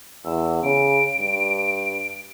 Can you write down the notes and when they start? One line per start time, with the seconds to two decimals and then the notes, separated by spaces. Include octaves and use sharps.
0.25 E2 E6
0.63 C#3 D7
1.19 G2